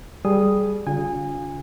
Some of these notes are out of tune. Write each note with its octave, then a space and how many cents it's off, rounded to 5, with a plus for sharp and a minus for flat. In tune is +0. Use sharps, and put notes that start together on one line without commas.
G3 +0 G#4 +20 D#6 +0
D3 -45 F4 +30 G#5 -25